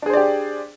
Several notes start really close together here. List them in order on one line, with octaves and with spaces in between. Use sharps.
D4 G#4 C5 D5 G4